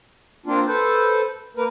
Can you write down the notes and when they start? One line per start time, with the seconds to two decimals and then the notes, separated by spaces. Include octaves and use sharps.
0.46 A#3 C4 D4 F4
0.67 A4 B4 C5
1.57 A#3 A#4 B4